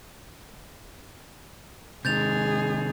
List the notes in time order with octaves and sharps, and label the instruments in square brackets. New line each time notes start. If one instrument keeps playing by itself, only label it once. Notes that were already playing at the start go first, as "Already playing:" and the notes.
[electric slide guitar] C3 D#3 [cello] G#3 G#4 [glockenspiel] G6 A6 F7